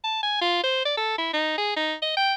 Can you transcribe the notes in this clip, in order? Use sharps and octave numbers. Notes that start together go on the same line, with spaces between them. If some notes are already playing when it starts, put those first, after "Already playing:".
A5
G#5
F4
C5
D5
A4
E4
D#4
G#4
D#4
D#5
G5